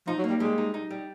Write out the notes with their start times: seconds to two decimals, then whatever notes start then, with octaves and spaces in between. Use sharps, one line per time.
0.07 F3 D#4
0.18 F#3
0.24 A#3
0.30 G3
0.40 G3 G#3
0.58 D#4
0.74 D#4
0.90 G3